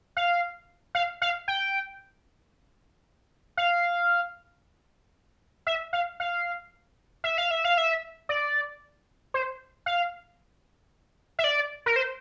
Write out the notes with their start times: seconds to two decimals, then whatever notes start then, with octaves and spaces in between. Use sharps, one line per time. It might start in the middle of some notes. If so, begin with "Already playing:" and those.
0.17 F5
0.95 F5
1.22 F5
1.48 G5
3.57 F5
5.67 E5
5.93 F5
6.20 F5
7.24 E5
7.38 F5
7.51 E5
7.65 F5
7.78 E5
8.29 D5
9.34 C5
9.86 F5
11.39 E5
11.44 D5
11.86 A#4
11.96 C5